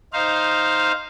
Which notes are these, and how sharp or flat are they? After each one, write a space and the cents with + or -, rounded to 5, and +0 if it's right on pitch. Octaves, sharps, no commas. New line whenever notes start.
D#4 +0 C5 +0 F5 +0